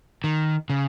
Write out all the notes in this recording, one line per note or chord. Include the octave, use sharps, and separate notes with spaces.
D#3
C#3